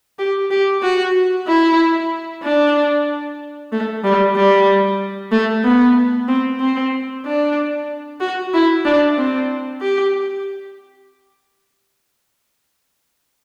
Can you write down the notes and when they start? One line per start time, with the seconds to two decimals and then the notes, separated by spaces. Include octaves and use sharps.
0.19 G4
0.51 G4
0.82 F#4
1.47 E4
2.43 D4
3.72 A3
4.04 G3
4.36 G3
5.31 A3
5.64 B3
6.28 C4
6.60 C4
7.25 D4
8.20 F#4
8.54 E4
8.85 D4
9.17 C4
9.81 G4